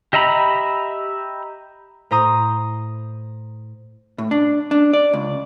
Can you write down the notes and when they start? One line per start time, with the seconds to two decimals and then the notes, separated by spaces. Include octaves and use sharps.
0.13 G4 D#5 E5 A#5 B5
2.11 A2 C5 A#5 D#6
4.18 A2
4.31 D4
4.71 D4
4.93 D5
5.13 C#2